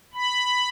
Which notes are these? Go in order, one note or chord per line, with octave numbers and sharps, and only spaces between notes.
B5